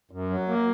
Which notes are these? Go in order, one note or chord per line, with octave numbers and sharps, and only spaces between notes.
F#2
F#3
A#3